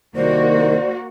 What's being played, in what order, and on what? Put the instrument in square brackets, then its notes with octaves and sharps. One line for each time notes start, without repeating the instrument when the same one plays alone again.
[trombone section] C2 D#3 [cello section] A#3 F#4 [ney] C5 [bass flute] D5